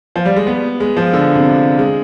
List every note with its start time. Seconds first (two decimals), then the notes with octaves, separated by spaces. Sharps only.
0.16 F3
0.25 G3
0.36 G#3
0.47 B3
0.80 G#3
0.97 F3
1.13 D3
1.35 C3
1.79 G#3